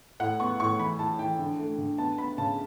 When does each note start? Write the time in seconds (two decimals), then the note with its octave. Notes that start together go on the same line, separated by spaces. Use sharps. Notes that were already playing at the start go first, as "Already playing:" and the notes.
0.20 A2 F#5
0.40 B3 C#6
0.60 A2 C#6
0.79 E3 B5
0.99 E3 A5
1.19 E3 G5
1.39 D3
1.59 A3
1.78 D3
1.98 B3 A5
2.18 B3 B5
2.38 C#3 A5